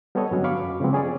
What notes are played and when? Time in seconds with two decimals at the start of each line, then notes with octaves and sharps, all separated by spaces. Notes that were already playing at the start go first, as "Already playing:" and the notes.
0.15 G3 B3 G4 A4 C#5 D#5
0.31 G2 D3 F#3 C#4
0.44 F5 B5 C#6 D6
0.62 F#2
0.80 C#3 F3 G#3 B3 C4
0.93 C#4 G#4 C#5 D5